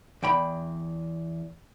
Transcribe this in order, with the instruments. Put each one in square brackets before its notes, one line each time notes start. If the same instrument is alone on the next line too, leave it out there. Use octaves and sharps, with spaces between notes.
[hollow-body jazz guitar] E2 G5 B5